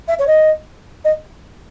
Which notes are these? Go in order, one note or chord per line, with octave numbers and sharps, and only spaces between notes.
E5
C#5
D#5
D#5